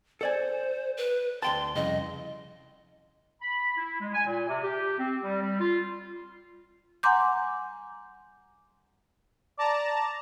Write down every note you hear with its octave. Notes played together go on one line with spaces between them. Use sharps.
A4 C5 D5 G#5
B4
D2 G5 A5 C6
C2 F2 C#3 D#5
B5
E4
G#3
G#5
A#2
C3
G4
C4
G3
G3
F4
F#5 G#5 A#5 C6 D6 G6
D5 A5 A#5